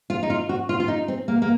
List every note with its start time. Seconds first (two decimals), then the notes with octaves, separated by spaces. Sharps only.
0.10 F4
0.23 D#4
0.30 F4
0.49 F#4
0.69 F4
0.80 F4
0.88 D#4
1.08 C4
1.28 A#3
1.42 A#3